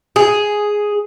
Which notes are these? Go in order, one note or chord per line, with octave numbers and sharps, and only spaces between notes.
G#4